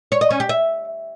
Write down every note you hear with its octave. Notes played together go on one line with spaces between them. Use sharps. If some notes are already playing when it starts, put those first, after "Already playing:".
C#5
D#5
C#4
G4
E5